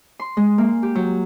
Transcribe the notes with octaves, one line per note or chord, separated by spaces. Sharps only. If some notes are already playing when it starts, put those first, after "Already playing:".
C6
G#3
A#3
G4
F#3